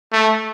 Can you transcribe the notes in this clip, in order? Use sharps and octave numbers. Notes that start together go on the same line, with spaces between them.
A3